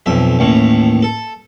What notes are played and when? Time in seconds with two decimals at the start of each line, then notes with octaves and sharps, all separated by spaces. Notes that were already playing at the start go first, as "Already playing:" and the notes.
0.06 B1 F2 E5
0.39 A1 D#2 A2
1.03 A4